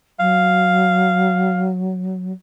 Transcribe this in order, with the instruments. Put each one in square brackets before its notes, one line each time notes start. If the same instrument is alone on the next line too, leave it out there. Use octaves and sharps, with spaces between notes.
[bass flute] F#3 [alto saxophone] F5